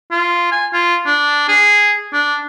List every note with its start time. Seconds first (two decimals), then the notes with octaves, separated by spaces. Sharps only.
0.11 F4
0.52 G#5
0.73 F4
1.06 D4
1.48 G#4
2.13 D4